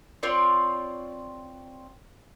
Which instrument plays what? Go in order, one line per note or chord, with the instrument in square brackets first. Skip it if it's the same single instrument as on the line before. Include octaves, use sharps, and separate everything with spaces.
[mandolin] C4 F4 C#5 D5